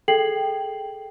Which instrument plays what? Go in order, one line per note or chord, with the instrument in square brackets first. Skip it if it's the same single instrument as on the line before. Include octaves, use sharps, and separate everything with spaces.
[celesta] G#4 A4 G5 G#6 C7 F#7